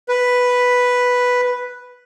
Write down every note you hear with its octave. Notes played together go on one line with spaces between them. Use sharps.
B4